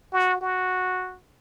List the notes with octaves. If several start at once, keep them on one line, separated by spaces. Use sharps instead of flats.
F#4
F#4